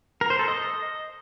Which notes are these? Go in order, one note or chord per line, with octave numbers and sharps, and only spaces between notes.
A#4
C5
A4
D#5